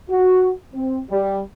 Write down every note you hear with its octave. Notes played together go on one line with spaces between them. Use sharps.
F#4
C4
G3